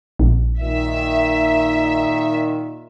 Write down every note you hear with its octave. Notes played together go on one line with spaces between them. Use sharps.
A#1
A#2 D#3 E5